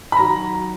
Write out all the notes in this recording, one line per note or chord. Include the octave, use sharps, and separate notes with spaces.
B5
D#3 F#3 A#5